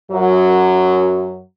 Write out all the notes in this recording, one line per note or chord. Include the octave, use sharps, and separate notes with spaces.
F#2 F#3